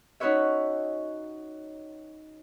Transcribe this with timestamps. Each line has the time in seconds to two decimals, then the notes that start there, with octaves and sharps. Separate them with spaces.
0.20 C#4 D#4 F#4 B4 C#5 E5